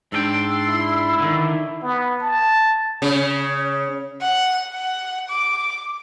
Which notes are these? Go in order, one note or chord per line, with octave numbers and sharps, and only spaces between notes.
G#2 D4 A4 G5 C6 E6
E4
D3 D#3
B3
A5
C#3
F#5
F#5
D6